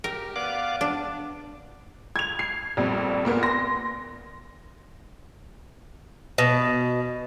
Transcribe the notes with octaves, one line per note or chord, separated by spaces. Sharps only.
G4 A#4
B3 D5 F5 D6
D4
G#6 F7
C7
A#1 F2 G3
A#2 A#3 B3
C6 A#6
B2